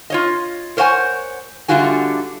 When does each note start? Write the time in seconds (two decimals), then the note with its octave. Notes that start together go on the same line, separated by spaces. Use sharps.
0.10 F4 C#5 D#5
0.77 A#4 C5 C#5 F#5 G#5
1.68 D3 G3 A3 F4 F#4 G#5